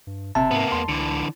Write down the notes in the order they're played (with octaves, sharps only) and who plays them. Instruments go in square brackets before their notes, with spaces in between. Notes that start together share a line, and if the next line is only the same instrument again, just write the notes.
[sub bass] G2
[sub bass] F#1 [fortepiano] C3 [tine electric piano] A5
[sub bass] G#2 [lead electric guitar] A#3 B3
[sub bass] E2 [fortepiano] C6
[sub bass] C#2 [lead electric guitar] D3 E3